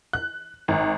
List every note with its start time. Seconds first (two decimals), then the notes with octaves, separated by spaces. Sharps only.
0.13 F#6
0.68 G#1